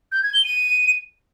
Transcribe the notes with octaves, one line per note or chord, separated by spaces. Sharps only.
G6
G#6
G7
D#7